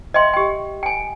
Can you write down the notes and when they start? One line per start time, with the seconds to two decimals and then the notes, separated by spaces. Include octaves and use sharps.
0.14 D#5 E5 G5 C6
0.34 G4 G5
0.83 G5 G#5